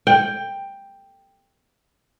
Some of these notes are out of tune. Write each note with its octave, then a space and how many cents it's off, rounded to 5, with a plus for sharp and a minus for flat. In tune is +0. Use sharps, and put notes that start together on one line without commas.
G5 +10